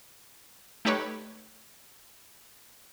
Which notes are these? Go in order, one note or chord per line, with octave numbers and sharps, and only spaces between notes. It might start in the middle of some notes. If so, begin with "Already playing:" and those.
A3 D#4 G4 B4 C#5